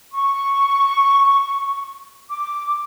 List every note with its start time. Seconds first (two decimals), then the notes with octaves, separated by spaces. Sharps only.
0.13 C#6
2.29 D6